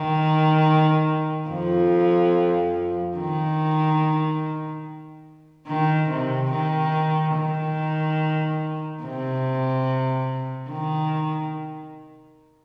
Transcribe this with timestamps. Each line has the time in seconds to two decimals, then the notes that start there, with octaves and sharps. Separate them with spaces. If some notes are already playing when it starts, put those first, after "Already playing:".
Already playing: D#3
1.49 F2 F3
3.16 D#3
5.67 D#3
6.09 C3
6.51 D#3
7.35 D#3
9.02 C3
10.69 D#3